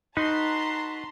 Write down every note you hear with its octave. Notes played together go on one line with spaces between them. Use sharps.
D#4 F#4 B4 A5 A#5 C6